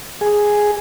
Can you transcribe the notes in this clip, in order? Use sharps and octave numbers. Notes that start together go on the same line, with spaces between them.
G#4